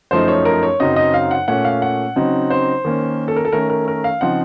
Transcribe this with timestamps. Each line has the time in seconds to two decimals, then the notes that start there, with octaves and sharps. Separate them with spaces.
0.11 F#2 F3 A3 D#4 C5
0.28 C#5
0.45 A#4
0.63 C#5
0.80 F#2 C#3 F#3 C4 D#4 D#5
0.96 D#5
1.14 F5
1.31 F#5
1.48 A#2 A3 C#4 F#5
1.65 F5
1.82 F#5
2.16 C#3 F#3 C4 D#4
2.50 C5
2.85 D#3 A#3 C#4
3.28 A4
3.36 A#4
3.45 A4
3.53 D#3 A3 C#4 A#4
3.70 A#4
3.88 A#4
4.04 F5
4.21 C#3 F3 C4 D#4 F#5